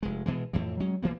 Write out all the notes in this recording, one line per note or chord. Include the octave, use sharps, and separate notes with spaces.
F1 G#3
B2 E3 G#3
F2 A2 E3
F#3 G#3 C#4
B1 E3 A#3 B3